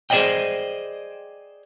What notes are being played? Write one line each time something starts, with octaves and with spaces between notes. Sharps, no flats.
G#4 C5 D5 D#5 G5